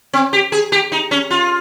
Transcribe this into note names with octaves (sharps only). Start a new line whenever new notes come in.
C4
G4
G#4
G4
D#4
C#4
F4